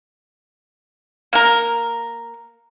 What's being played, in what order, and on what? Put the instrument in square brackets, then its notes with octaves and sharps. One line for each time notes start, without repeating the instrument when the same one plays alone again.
[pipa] A#3 A#4